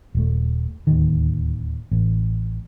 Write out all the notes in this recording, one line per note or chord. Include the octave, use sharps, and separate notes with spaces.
D#1 A3
D1 D#2 D#3
A1